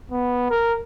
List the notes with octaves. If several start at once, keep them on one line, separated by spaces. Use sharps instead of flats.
B3
A#4